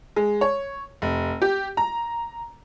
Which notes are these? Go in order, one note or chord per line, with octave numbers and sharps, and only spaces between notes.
G#3
C#5
F1
G4
A#5